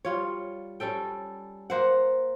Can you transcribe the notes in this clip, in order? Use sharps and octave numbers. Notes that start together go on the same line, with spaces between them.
G3 F4 C#5
G3 C#4 A4 G5
A#3 C5 F#5